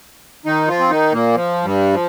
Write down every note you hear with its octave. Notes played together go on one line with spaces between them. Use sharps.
D#3 D#4
F3 F4
C4
D#3 D#4
A#2 A#3
F3
G2 G3
F3